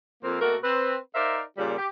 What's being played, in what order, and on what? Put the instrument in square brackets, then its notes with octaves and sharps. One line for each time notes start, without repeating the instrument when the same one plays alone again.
[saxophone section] F2 A#3 C4
B2 A3 A#3 F#4 A#4
C4 B4
D#4 A#4 C5 D5 E5 F5
A#2 C#3 G3
G4